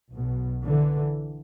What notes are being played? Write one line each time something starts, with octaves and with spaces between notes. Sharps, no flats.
B1 B2
D3 E3